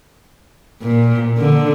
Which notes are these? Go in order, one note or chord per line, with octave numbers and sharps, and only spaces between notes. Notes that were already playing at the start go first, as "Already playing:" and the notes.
A#2
D3